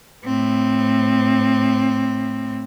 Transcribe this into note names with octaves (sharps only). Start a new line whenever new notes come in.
A2 C4